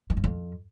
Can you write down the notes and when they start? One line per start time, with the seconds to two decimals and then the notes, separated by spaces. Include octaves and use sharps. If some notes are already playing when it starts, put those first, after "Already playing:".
0.10 D#3
0.17 G2
0.24 F2